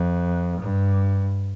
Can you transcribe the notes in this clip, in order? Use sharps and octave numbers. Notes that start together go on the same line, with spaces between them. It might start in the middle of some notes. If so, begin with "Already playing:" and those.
Already playing: F2
G2